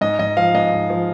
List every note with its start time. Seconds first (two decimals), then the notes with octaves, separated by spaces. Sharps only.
0.01 G#2 D#5
0.19 G#2 D#5
0.37 F3 F5
0.55 G#2 D#5
0.72 G#2
0.90 F3